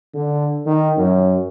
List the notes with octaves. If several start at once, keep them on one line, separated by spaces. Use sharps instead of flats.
D3
D#3
F#2